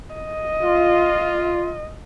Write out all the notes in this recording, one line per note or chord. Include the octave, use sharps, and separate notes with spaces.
D#5
F4